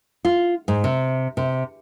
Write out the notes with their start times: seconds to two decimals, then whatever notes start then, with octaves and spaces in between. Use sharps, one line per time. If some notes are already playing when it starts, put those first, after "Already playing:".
0.25 F4
0.68 G#2
0.84 C3
1.37 C3